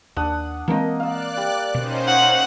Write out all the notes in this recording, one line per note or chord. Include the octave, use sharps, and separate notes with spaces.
D#2 D4 F#5 D#6
E3 G#3 A#3 C4 D#5
D5 F5 E6 F#6
G3
B2 C#4 D#4 C5
F#5